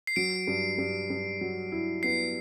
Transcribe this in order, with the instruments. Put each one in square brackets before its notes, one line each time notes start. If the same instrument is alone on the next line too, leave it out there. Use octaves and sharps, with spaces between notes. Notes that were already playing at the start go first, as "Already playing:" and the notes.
[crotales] C7
[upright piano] F#3 [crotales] D7
[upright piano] G2
G2
G2
F#3
E4
[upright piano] B3 [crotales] C7